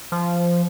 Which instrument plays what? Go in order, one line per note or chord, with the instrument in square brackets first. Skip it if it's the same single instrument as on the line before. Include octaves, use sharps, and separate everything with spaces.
[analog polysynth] F3